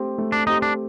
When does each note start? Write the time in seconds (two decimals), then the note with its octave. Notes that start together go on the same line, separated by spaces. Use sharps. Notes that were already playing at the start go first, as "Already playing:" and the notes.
Already playing: A3 C4 G4
0.18 A3
0.32 D4
0.47 C4 D#4 G4
0.62 D4